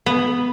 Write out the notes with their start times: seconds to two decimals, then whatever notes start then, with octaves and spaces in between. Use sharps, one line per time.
0.06 B3